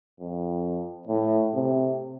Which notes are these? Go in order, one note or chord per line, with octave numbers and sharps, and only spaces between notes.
F2
A2
C3